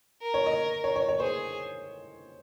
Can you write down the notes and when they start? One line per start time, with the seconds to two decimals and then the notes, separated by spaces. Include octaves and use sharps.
0.22 A#4
0.34 C#5
0.46 D#5
0.84 C#5
0.96 C#5
1.09 C#5
1.20 G#4 C5